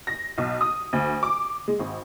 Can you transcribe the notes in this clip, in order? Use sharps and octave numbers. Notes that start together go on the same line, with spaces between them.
A#6
B1
D#6
D2
D6
G#3
G#1